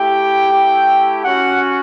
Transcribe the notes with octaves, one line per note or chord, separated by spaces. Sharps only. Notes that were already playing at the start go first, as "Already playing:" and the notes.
Already playing: A3 E4 G4 G5
A3 E4 G4
C#4 F#4 F#5